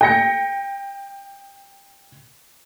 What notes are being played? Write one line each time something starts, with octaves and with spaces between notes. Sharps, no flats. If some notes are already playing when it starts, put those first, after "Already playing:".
G5 A#6 C#7